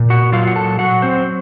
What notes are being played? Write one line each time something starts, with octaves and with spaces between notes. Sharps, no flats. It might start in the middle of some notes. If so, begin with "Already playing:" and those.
Already playing: A#2
F#4 F#5
F#3 F4 F5
F#5
A4 A5
F#3 F#4 F#5
C4 C5